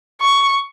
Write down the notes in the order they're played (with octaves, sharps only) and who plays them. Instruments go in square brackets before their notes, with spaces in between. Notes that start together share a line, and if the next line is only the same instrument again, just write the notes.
[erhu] C#6